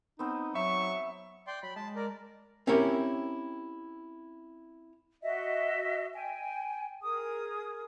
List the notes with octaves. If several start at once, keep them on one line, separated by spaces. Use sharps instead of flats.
B3 C4 D#4
F#3 E5 C#6
D5 G5 C6
F#3 B5
G#3 A5
A#4 D5
C4 C#4 E4 G4 A#4 C#5
F#4 D#5 E5
G5 G#5
G#4 A#4 D#6